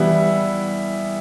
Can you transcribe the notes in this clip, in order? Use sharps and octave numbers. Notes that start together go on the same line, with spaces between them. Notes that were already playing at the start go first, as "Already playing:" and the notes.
Already playing: E3 G3 B3 E4